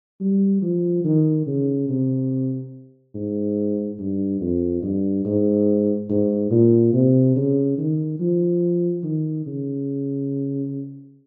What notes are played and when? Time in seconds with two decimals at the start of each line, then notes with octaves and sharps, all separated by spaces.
0.21 G3
0.62 F3
1.04 D#3
1.46 C#3
1.89 C3
3.15 G#2
3.99 G2
4.40 F2
4.83 G2
5.25 G#2
6.10 G#2
6.51 A#2
6.93 C3
7.36 C#3
7.78 D#3
8.19 F3
9.04 D#3
9.46 C#3